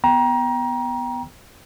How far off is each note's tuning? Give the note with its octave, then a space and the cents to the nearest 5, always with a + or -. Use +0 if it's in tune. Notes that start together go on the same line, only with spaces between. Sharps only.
B3 +0 G5 +0 A#5 +25